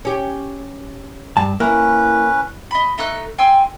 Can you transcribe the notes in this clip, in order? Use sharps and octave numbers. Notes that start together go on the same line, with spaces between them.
C#4 G4
G2 A5
A#3 C#4 E4 B4
D#5 B5
A3 D#4 E6 F#6
G5 G#5 C6 E6